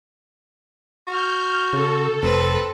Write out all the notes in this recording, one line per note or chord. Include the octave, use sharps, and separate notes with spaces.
F#4 F6 G6
C#3 A4
F1 C4 B4